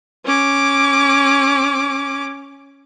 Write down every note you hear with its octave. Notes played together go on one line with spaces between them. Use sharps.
C#4 D6